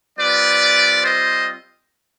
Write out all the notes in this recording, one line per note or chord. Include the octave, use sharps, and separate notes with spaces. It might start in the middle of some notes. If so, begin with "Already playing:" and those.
G3 C4 F4 B4 D5
C5 D#5